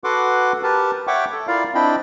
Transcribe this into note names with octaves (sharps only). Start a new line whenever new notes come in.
F#4 A4 B4 F#5 C6 D6
G4 A#4 B4 A5
C#5 E5 F#5 G5 C#6 D6
A4
E4 F4 A#4 D5 F5
C4 D4 E4 D#5 G5 B5